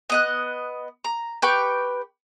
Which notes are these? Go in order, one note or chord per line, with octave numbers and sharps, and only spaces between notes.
B3 D#5 F#6
A#5
G4 B4 G5 C#6